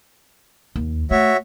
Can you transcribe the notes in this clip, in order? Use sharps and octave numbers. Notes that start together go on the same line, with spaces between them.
D#2
A3 F#4 C#5 E5